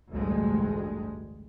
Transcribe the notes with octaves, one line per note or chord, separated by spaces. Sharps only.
A1 D2 G2 G3 G#3